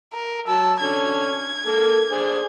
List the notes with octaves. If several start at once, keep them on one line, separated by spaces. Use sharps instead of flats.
A#4
F#3 A5 E6
D3 C#4 G#6
A#3 A4
D4 G#4 C5